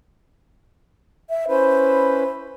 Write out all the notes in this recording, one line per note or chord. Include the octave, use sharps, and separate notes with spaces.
E5
C#4 E4 B4 C5